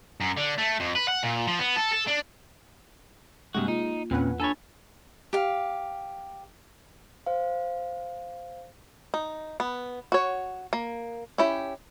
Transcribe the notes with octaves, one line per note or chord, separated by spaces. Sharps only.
F#2
D3
A3
F2
B4
F#5
A#2
F3
B3
A4
A4
D4
G2 C3 G#3 A#3 F#4
D#4 F4
E2 A#2 C4 C#4 B4 F#5
D4 A4 C#5 G#5 A#5 B5 A6
G4 F5
C5 F5
D#4
B3
F#4 C#5
A#3
C#4 E4 G4